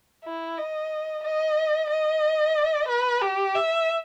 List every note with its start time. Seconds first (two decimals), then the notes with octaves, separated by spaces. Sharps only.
0.25 E4
0.58 D#5
1.23 D#5
1.90 D#5
2.88 B4
3.21 G4
3.55 E5